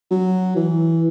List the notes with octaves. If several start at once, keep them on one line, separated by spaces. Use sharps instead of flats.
F#3
E3